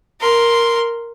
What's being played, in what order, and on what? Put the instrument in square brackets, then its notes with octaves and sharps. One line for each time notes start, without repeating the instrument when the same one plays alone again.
[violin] A#4 C6